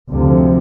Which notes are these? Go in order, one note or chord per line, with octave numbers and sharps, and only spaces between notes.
D2 C3 F3